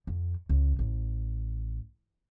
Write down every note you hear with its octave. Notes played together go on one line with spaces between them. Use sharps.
F2
C#2
A1